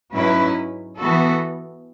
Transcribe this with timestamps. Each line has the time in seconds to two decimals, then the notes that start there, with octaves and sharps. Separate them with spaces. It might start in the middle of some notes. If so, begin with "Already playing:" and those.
0.14 G#2 F#3 C#4 E4 B4
0.98 E3 B3 F#4 A4